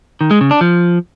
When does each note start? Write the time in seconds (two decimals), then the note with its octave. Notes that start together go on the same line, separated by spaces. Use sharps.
0.21 D#3
0.31 G#3
0.41 C#3
0.51 D4
0.61 F3